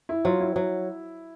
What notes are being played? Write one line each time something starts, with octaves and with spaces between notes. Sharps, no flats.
E4
F#3 F4
E4
F#3